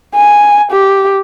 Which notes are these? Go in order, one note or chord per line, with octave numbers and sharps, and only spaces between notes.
G#5
G4